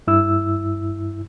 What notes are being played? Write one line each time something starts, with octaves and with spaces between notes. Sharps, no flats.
G2 E4 E6